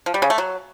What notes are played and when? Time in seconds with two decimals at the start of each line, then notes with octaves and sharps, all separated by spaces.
0.06 F3
0.14 G3
0.22 C#3
0.30 A3
0.38 F#3